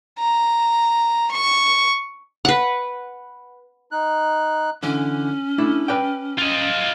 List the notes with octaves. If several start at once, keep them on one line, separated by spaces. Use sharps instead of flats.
A#5
C#6
B4 F#5
D#4 F#6
D3 E3 C#4
A3 D4 E4
B4 D5 G5
F4 D#5